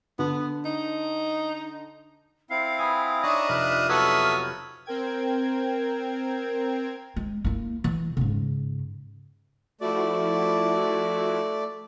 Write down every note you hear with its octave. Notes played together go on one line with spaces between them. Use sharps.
D3 B3
D#4
C4 E4 F5 C7
G#5 B5 C6 D#6
D4 D#4 C#5 D#5 E5 A#5
F1 B4 D#6 F6 F#6
F#3 B3 A4 E5 D#6 E6
D#4
C4 A#4 G5 G#6
G#3
A#3 E4
E3
G#2 C#3
F3 A3 E4 F#4 D5